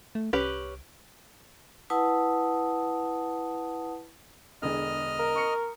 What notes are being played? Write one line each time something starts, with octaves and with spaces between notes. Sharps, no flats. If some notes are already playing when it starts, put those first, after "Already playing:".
A3
C2 C#4 G4 B4
E4 B4 F#5 A5 D#6
E1 D3 G#4 D#5 F6
A#4
C#6 D#6 C#7